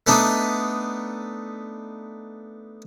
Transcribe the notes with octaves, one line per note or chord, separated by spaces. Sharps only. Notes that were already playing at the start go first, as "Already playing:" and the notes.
A3 B3 D4 D#4